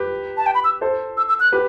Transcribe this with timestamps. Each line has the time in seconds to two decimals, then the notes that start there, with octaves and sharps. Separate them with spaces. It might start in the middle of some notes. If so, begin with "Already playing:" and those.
Already playing: G4 B4
0.37 A5
0.46 G5
0.55 B5
0.64 E6
0.81 A4 C5
1.17 E6
1.29 E6
1.40 F#6
1.52 G4 B4